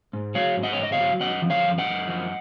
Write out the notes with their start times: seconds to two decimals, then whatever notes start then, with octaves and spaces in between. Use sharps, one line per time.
0.13 G#2
0.35 F#3 C#5 F5
0.57 G#2
0.63 D#5 F#5
0.73 C#5
0.78 G#2
0.83 D#5
0.92 C#5 F5
1.00 F#3
1.20 F#2 D#5 F#5
1.42 F3
1.50 C#5 F5
1.65 F#2
1.78 D#5 F#5
1.86 F#2
2.08 F3